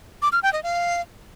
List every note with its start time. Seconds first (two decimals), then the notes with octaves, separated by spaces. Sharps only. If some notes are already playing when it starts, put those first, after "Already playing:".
0.22 D6
0.33 F6
0.43 G5
0.53 D#5
0.63 F5